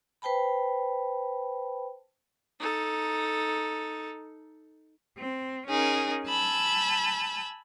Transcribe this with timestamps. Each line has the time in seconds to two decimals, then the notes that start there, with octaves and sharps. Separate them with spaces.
0.22 B4 C5 G5 A5 B5
2.60 D#4 A4
5.18 C4
5.66 C#4 D#4 G#4 A#4
6.25 G#5 A5 B5 E6 G6